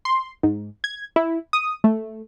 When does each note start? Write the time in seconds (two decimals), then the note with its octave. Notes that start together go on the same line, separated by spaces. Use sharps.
0.05 C6
0.43 G#2
0.84 G#6
1.16 E4
1.53 D#6
1.84 A3